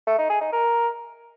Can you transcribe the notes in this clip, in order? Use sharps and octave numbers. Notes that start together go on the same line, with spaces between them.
A3
D#4
G#4
D#4
A#4